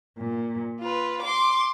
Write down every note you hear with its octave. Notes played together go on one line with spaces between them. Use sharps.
A#2
F4 B4
C6 D6